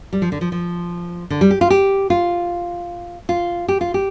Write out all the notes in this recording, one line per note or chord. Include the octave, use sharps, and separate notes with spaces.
G3
F3
D3
F3
F3
D3
G3
G4
F4
G4
F4
F4
G4
F4
G4